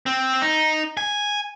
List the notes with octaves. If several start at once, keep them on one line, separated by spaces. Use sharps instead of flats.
C4
D#4
G#5